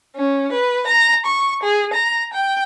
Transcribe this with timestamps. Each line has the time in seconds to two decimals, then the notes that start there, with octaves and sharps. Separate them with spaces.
0.14 C#4
0.51 B4
0.86 A#5
1.23 C#6
1.62 G#4
1.92 A#5
2.32 G5